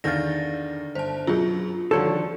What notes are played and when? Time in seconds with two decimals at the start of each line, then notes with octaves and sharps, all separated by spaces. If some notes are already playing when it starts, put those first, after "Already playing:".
0.04 E2 D3 D#3 F5 G6 A6 A#6
0.95 G1 C5 A5
1.27 F#2 B2 F#3 F4 G#4
1.91 D3 D#3 F3 G3 F#4 A4 C5 C#5